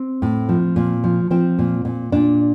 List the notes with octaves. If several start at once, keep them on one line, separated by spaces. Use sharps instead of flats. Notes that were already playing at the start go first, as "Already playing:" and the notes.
Already playing: C4
A2
F3
A#2
F3
F3 C4
A#2
A#2
A#2 D4